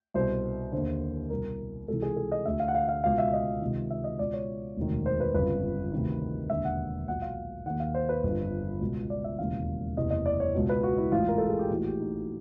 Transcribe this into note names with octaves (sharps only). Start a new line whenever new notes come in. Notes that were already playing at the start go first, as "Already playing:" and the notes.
C2 B2 C5
D#2 D3 C5
C2 B2 A#4
C#2 C3 E3 A4
G#4
A4
D#5
D2 D3 E5
F5
F#5
F5
F5
C#2 B2 F5
E5
D#5
C#2 C3 D#3
E5
D#5
C#2 B2 D5
C#5
E1 D2 C3 D#3
C5
B4
G1 F2 C#3 B4
D2 C3 D#3
E1 D#2 D3 E5
F#5
B1 A#2 F#5
F5
D#2 D#3 F#5
F5
C5
B4
G1 F2 D3
C#2 B2
D5
E5
E1 D#2 C#3 E3 F5
F#1 E2 C3 E3 D#5
D#5
D5
C#5
C#2 B2
B4
F#4
E4
A1 G#2 E3 F4
A#4
A4
G#4
G4
A#1 A2 E3 F#4
G4
D#4